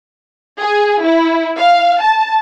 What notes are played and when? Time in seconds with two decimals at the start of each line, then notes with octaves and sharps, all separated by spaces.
0.59 G#4
1.05 E4
1.58 F5
2.01 A5